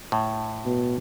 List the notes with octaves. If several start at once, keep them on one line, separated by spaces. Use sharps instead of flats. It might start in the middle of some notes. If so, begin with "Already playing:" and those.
A2
B2